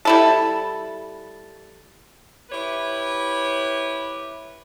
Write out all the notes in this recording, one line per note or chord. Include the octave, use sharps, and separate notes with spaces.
G3 E4 A4
E4 G4 B4 C#5